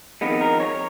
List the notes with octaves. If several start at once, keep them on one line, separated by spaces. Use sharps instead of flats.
F2 D#3 G#3 B3
A#4
C#5